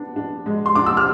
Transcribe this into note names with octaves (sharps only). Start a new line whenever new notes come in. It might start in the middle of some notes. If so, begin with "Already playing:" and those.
Already playing: B3 D4
D4
G#3
C6
D4 D6
E6
F6